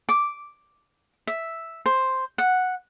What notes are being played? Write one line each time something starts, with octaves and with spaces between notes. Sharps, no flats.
D6
E5
C5
F#5